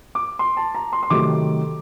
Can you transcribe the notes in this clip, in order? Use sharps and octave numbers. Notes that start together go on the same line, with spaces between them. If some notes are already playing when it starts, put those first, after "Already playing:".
D6
C6
A5
A#5
C6
C6
C3 D#3 F#3 A3 D6